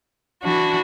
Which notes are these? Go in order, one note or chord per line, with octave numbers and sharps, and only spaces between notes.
E3 D4 F#4